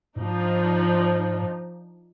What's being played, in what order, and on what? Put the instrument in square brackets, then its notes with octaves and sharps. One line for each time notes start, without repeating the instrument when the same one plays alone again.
[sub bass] G#2 [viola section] F3 D4 D#4